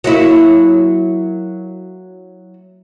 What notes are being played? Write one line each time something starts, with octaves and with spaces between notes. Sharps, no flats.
F#3 A#3 E4